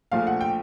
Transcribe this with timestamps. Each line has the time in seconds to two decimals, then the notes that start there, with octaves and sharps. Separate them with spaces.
0.12 A#1 A#2 F3 A3 F5
0.27 F#5
0.41 G5